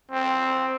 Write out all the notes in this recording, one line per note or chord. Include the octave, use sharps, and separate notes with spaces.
C4